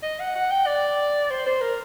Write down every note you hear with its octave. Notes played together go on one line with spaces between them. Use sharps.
D#5
F#5
F#5
G5
D5
C5
C5
A#4